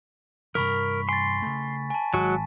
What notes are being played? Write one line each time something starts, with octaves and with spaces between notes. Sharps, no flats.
G2 C3 E3 A#4 B5 C#6 B6
G#5 C6 A6
C#3 A3
G#5 A5
G#1 F#3 G#3 F#4